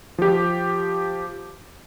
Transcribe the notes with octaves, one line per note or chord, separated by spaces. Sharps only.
F3 G4